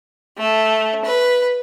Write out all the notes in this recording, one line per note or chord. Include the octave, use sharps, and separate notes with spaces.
A3
B4